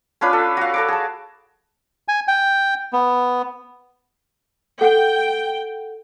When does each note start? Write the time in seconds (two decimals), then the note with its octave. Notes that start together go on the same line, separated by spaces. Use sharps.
0.21 C#4 D4 F4 B4
0.33 A4
0.57 F#4 F5
0.74 A4 C#6 D6
0.88 G#4 A5
2.08 G#5
2.28 G5
2.93 B3
4.81 A4 F#5 G5